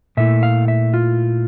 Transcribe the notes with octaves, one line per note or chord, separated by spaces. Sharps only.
A#2 A3 E4 E5
F5
E5
F4